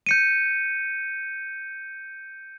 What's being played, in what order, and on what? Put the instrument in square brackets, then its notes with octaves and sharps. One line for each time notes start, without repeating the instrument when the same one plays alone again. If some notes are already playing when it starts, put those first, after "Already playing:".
[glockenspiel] G6 C#7 D#7